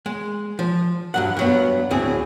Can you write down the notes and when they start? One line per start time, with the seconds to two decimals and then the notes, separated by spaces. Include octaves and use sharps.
0.06 G#3
0.59 F3
1.14 G2 F#3 F#5
1.37 G2 F#3 B3
1.91 D2 A2 C4 G#4